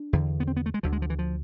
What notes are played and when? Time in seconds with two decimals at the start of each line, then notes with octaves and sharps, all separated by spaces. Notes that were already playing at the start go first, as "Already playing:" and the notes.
Already playing: D4
0.13 E2 D3
0.40 B3
0.48 C4
0.57 B3
0.66 A3
0.74 G#3
0.83 D2 D3 F3
0.92 G#3
1.02 F3
1.10 E3
1.19 F3